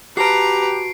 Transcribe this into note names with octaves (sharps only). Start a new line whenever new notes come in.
F#4 G4 B4 A5 A#5 C7 D7